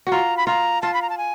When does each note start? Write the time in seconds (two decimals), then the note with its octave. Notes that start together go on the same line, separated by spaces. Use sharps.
0.07 F#4
0.12 F4 A#5
0.37 B5
0.47 F4 A#5
0.82 F4 A5
0.94 B5
1.02 A#5
1.10 A5
1.18 G#5